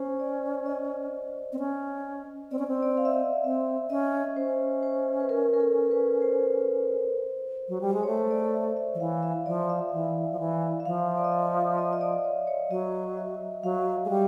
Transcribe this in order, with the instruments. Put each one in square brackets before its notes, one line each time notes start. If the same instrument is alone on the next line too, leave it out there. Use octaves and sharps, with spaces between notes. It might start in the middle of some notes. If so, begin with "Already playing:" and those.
Already playing: [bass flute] C#4 [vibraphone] C5
[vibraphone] D5
D#5
[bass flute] C4
C#4
[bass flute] C4 [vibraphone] D5
[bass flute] C#4
C4
[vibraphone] D5
F5
E5
D#5
[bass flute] C4 [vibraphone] E5
[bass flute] C#4 [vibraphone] D#5
[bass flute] C#4 [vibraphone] C5
[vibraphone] C5
B4
A#4
A#4
A4
B4
C5
[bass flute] F#3
G3
G#3
[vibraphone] C#5
[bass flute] A3 [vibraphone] C5
[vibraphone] D5
E5
E5
[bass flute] F3
[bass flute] E3 [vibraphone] F5
[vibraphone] E5
[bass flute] F3 [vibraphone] D5
[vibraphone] E5
[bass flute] E3
F3
E3
[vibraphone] E5
[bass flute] F3 [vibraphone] F5
[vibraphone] D5
D#5
E5
D#5
E5
D#5
D5
C#5
C#5
[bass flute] F#3 [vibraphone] D#5
[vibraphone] E5
[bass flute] F#3 [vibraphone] F5
[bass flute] G#3
G3